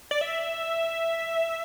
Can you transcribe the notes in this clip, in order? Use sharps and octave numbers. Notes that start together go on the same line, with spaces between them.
D5
E5